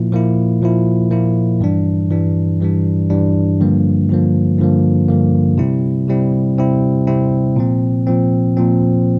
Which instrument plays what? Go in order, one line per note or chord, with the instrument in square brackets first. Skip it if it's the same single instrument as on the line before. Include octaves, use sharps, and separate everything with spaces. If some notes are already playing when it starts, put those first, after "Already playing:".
Already playing: [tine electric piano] A#2 F3 A#3 E4
A#2 F3 A#3 E4
A#2 F3 A#3 E4
A#2 F3 A#3 E4
G2 E3 G3 D4
G2 E3 G3 D4
G2 E3 G3 D4
G2 E3 G3 D4
G2 D3 F3 A#3
G2 D3 F3 A#3
G2 D3 F3 A#3
G2 D3 F3 A#3
C3 G3 C4 E4
C3 G3 C4 E4
C3 G3 C4 E4
C3 G3 C4 E4
A#2 F3 C4
A#2 F3 C4
A#2 F3 C4